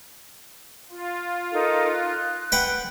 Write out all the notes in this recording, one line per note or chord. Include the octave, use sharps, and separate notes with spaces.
F4
D#4 A4 A#4
F#6
B4 F#5 G5